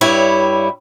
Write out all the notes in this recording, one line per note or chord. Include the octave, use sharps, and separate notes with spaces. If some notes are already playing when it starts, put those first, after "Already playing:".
G2 G3 E4 C#5